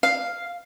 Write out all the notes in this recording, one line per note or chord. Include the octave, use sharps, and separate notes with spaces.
F5